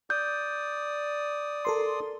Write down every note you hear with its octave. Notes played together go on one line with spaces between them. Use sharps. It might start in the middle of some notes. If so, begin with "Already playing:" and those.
D5 D#6 G6
A4 A#4 C6